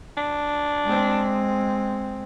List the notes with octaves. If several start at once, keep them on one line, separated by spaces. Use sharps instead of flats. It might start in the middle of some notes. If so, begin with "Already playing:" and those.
D4
G#3 C4